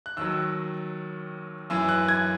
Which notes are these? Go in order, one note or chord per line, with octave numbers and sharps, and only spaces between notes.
F#6
D#2 D#3 F#3 E6
F#2 E3 E6
F#6
G#6